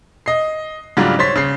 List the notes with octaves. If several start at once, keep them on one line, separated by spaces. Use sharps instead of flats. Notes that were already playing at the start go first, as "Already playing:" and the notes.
D#5 C7
G#2 C#3 F#3 G3 D4 F4
C5 C#5 C6 A6 B6
C#3 C7